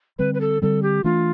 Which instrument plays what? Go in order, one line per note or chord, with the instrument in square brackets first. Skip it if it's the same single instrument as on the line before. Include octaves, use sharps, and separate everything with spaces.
[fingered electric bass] D3 G3 C4 [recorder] B4
[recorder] B4
A4
[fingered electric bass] D3 G3 C4 [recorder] A4
[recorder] G4
[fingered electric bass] E3 A3 D4 [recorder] F4